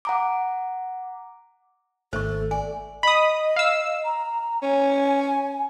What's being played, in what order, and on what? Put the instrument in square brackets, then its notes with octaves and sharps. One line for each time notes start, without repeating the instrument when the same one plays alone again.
[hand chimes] F#5 A#5 D6
[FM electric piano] G#1 D#3 [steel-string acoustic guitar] A3 [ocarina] A4 [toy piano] C5 C#6
[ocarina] A4 [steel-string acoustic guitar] D5 [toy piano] G#5
[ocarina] D#5 [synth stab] B5 D#6
[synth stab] F5 E6
[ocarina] A#5
[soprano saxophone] C#4 [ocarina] G#5